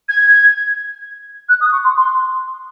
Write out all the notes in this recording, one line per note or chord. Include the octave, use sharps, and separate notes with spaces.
G#6
F#6
D#6
C#6
C6
C6